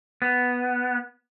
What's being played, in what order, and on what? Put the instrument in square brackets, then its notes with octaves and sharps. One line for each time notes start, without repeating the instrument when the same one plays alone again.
[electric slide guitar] B3